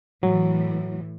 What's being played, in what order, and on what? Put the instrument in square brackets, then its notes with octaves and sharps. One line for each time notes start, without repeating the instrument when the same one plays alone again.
[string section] A2 E3 [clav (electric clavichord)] F#3